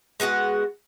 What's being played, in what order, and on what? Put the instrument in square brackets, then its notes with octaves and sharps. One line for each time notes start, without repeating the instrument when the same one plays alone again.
[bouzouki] G#3 B3 F#4 F#5